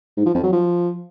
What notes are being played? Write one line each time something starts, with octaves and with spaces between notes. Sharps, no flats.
G#2
F3
F2
F#3
F3